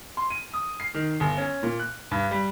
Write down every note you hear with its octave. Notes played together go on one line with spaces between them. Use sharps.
C6
D#7
D#6
C7
D#3
G1
C#4
A#2
F#6
G2
G3